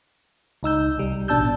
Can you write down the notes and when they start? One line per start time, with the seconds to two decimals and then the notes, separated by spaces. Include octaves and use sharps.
0.63 C#2 D#4 E6 G6
0.98 C2 G3
1.28 A1 B2 D4 A5 E6 G6